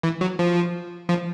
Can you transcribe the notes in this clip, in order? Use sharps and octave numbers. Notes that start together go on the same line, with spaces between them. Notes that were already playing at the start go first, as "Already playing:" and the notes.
E3
F#3
F3
F3